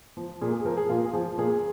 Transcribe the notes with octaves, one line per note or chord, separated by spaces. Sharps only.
F3
A#2 G#4
G#4
F3 A#4
G#4
A#2 F4
G#4
F3
A#2 G#4